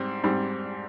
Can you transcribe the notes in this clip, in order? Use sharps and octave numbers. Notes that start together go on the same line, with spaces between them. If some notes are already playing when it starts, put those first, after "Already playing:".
Already playing: G#2 G3 C4
G#2 G3 C4